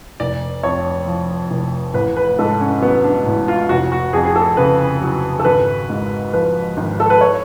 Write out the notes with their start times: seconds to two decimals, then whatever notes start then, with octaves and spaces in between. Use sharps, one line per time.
0.20 F1 D5
0.63 F2 C#5
1.06 F3
1.51 F1
1.94 A1 B4
2.16 B4
2.39 G#2 A4
2.61 C#4
2.82 F#3 B3
3.04 D4
3.26 A1
3.48 F4
3.69 F1 F#4
3.92 F#4
4.13 F2 G#4
4.25 G#4
4.36 A4
4.57 C#3 B4
5.01 F#3
5.39 A4
5.45 G#1 B4
5.90 G#2
6.33 F3 B4
6.77 G#1
7.00 A4
7.10 B4
7.21 C#5